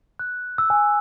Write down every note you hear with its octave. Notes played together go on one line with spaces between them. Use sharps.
F#6
E6
G#5